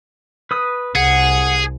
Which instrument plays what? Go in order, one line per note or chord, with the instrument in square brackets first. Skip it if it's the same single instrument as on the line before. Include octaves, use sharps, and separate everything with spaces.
[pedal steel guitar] B4 D#6
[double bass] C2 [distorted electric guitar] G#4 [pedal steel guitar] F#5